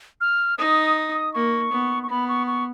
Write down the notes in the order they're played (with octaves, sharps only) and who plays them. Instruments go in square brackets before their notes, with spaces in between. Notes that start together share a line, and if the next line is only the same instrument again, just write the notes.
[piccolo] F6
[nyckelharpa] D#4 [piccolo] D#6
[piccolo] D#6
D#6
[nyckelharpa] A#3 [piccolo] C#6
[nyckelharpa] B3
[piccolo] C#6
[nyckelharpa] B3 [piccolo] B5
[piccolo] C#6
C#6